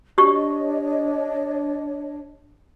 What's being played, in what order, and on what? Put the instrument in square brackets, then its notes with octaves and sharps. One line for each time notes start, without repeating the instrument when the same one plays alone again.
[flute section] D4 C#5 D#5 [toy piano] G4 C#6